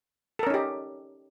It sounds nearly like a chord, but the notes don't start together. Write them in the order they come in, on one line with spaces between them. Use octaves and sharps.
A4 A#4 C#4 D#4 G4